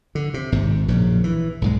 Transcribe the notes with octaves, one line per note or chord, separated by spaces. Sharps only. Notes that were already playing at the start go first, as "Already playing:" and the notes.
D3
C3
G#1 G#2
A#1 F#2 C#3
E3
B1 G#2 G#3